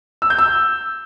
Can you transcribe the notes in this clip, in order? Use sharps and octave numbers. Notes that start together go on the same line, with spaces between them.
E6
G6
E6